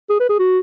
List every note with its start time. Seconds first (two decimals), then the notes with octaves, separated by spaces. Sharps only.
0.10 G#4
0.20 B4
0.29 G#4
0.39 F#4